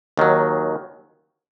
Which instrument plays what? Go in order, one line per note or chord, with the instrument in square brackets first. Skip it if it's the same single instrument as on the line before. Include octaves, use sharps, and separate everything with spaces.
[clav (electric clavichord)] D#2 D#3 F#3